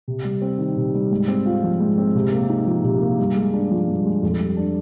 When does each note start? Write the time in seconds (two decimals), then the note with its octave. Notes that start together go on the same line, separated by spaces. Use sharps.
0.08 C3
0.25 G3
0.42 C4
0.59 D#3
0.77 C3
0.94 G3
1.11 G#2
1.28 C4
1.46 F4
1.63 F3
1.80 G#2
1.98 C4
2.15 C3
2.32 A#3
2.49 D#4
2.67 F3
2.84 C3
3.01 A#3
3.19 G2
3.36 G#3
3.53 D4
3.71 F3
3.88 G2
4.05 G#3
4.22 F2
4.40 G3
4.57 D4